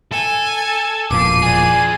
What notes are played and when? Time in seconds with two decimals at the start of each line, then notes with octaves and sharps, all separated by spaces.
0.12 A4 G#5
1.11 E1 A#2 F3 D6 C7 D#7
1.43 G#4 D5 G#5